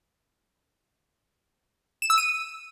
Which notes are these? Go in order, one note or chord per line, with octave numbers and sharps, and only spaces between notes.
E7
E6
D#7